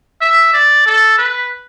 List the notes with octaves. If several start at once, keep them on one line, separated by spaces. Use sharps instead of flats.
E5
D5
A4
B4